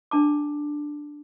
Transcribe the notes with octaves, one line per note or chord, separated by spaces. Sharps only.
D4 A5 D6